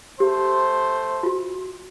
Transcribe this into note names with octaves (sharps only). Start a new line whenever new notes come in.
A3 G4 C5
F4 F#4